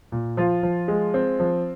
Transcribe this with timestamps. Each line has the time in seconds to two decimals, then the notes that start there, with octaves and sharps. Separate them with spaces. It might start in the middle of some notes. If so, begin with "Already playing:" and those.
0.12 A#2
0.37 F3 F4
0.63 F3
0.88 G#3
1.14 C4
1.40 F3